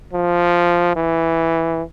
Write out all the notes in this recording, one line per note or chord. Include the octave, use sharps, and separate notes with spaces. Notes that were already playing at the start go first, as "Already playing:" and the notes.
F3
E3